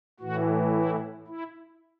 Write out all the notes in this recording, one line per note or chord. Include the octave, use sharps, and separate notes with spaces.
A2 E3 F#4
E4
E4